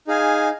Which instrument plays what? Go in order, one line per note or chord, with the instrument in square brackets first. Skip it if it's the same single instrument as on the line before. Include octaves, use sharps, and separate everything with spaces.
[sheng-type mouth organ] D#4 G#4 F5 G#5